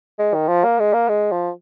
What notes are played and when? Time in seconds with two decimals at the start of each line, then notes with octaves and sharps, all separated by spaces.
0.19 G#3
0.34 D#3
0.48 F3
0.64 A#3
0.79 G#3
0.94 A#3
1.09 G#3
1.32 F3